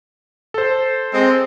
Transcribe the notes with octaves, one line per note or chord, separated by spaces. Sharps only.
A4 C5
G#3 C4